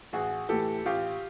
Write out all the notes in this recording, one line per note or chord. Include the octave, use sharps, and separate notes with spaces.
A1 F#4 G#4
A2 E3 G4 A4
A1 F4 G4